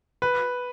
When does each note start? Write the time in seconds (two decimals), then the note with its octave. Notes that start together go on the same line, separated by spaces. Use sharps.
0.22 B4